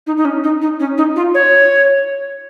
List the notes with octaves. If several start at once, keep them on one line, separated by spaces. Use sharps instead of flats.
D#4
D#4
C#4
D#4
D#4
C#4
D#4
F4
C#5